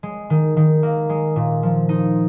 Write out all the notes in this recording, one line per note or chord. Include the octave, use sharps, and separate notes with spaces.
G#3
D#3
D#3
A#3
G#3
A#2
F3
D#4